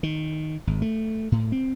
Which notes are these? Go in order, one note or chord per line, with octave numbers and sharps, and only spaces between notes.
D#3
G#1
A3
A2
C4